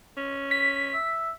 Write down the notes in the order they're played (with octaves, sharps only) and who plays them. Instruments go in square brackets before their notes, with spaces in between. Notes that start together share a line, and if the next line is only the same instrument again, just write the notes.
[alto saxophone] C#4
[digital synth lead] B6
[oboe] E5